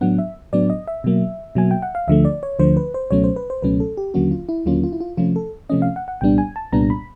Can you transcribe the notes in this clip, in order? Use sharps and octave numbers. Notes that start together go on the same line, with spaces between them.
A2 F#3 B3 D4 F#5
E5
A2 F#3 B3 D4 D5
D#5
E5
B2 F#3 A#3
B2 F#3 A#3 G#5
G5
F#5
F5
D2 D3 F3 A3 E5
D5
C#5
D2 D3 F3 A3 C5
B4
C5
C#2 B2 F#3 A3 C#4 C#5
C5
B4
C5
C#2 B2 F#3 A3 C#4 B4
A4
G4
D#2 D3 F#3 A#3 C#4 F#4
F4
E4
D#2 D3 F#3 A#3 C#4 F4
F4
E4
F4
C3 F3 A3 C#4 F4
A4
C3 F3 A3 C#4 D#5
F5
F#5
F#5
C2 A#2 G3 B3 D4 G5
G#5
A5
C2 A#2 G3 B3 D4 A#5
B5